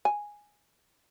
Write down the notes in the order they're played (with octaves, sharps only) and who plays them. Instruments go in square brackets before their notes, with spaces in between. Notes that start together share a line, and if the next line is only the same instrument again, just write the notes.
[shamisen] G#5